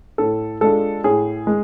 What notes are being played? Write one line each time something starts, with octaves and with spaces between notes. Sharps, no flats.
A2 A4
G#3 D4 F4 A4
A2 G#4
G#3